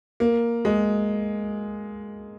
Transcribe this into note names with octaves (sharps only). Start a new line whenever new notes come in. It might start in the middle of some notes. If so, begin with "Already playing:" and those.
A#3
G#3